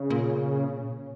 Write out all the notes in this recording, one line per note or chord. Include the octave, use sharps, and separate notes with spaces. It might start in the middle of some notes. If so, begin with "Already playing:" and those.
Already playing: C#3
A#2